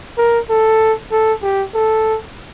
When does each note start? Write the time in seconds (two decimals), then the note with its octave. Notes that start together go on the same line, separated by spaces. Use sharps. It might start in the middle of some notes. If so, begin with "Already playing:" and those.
0.18 A#4
0.49 A4
1.11 A4
1.42 G4
1.74 A4